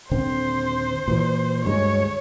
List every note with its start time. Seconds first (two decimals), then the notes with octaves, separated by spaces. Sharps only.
0.11 D#1 D3 C4 C5
1.08 A#2 E3
1.65 D2 G2 G#3 C#5